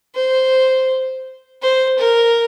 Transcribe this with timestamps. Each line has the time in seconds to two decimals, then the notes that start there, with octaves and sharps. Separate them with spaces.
0.15 C5
1.62 C5
1.99 A#4